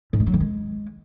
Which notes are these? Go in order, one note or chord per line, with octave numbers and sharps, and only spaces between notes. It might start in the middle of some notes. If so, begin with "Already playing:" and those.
G#2
A3
F#3
D#3
G#3